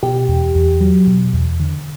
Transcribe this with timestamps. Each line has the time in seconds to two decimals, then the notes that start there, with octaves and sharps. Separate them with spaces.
0.03 B2 G4
0.29 E2
0.55 E2
0.81 F#3
1.07 B2
1.33 E2
1.60 D3